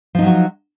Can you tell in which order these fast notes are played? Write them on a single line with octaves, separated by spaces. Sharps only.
F3 D#4 F#3 F#4